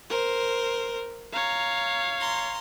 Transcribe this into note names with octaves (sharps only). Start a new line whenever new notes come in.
A#4 C5
C#5 F5 A#5
A#5 C6